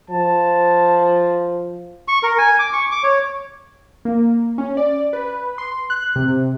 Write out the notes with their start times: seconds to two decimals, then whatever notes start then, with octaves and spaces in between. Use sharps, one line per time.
0.10 F3 A5
2.08 C#6
2.23 A#4
2.38 G#5
2.59 D6
2.73 C#6
2.92 D6
3.04 C#5
4.05 A#3
4.58 C#4
4.77 D5
5.13 B4
5.58 C6
5.90 F#6
6.16 C3